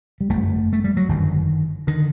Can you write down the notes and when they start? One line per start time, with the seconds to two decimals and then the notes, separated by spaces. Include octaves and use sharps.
0.21 G3
0.29 G1 F#2 D3 A3
0.73 A3
0.84 G3
0.97 F#3
1.09 G1 F#2 D3 D#3
1.87 D3 D#3